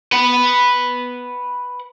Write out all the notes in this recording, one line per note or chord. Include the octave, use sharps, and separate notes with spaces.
B4 F#5